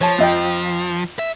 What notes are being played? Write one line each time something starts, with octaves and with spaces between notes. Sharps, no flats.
F3 C#5 A5
F2 D#5 G5
E5